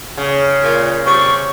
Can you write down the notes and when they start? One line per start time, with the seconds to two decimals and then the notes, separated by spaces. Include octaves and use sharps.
0.18 C#3
0.63 A#2
1.06 G3 C4 C#6